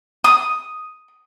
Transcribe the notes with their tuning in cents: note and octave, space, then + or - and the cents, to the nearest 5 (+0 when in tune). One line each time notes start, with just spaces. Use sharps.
D#6 +0